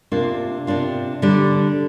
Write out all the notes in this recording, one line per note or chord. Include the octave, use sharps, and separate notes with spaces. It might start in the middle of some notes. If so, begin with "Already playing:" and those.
C3 A#3 D4 F4
C3 A#3 D4 F4
D3 G3 D4